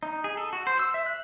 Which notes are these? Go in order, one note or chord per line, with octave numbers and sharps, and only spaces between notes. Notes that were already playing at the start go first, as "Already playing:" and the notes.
D#4
G#4
A4
F#4
C5
E6
E5
F#6